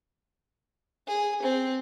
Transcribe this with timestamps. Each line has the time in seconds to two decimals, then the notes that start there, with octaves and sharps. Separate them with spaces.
1.08 G#4
1.43 C4